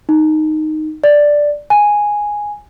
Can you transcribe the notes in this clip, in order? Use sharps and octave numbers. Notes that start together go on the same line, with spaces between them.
D#4
D5
G#5